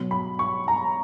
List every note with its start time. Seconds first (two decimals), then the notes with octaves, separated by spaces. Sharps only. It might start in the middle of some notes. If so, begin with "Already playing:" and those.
Already playing: B2 F#3
0.11 B5
0.39 C#6
0.68 A#5